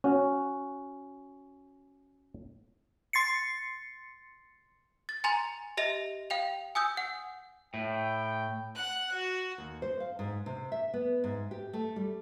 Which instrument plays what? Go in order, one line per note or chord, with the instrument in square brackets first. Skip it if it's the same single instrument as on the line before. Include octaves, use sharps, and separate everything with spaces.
[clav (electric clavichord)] C#4 F#4
[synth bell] C6 A6 C7 C#7
[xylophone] A6
G#5 A#5 C6 A6 F7
G4 D#5 E5 A#6 F7
F5 G5 F7
G#5 D#6 E6 G6
F#5
[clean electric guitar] A2 [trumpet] G5
[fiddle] F#5 F#6
F#4
[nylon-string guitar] D#2
C5
F5
G#2
C3
E5
B3
G#2
G4
A3
G3